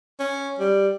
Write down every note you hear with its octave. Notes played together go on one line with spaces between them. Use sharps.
C#4
G3